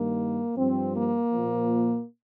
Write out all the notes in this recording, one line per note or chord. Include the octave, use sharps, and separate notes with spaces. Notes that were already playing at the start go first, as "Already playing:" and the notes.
Already playing: G2 D#3 A#3
G2 F3 C4
A#3
A#2 F3